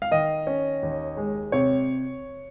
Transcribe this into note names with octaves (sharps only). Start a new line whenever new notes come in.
F5
D#3 D#5
C#4
D#2
G#3
C3 C#5